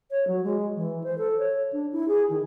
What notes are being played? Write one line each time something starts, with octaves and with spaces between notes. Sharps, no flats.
C#5
F#3
G#3
E3
C5
A4
C#5
D4
E4
G#4
D#3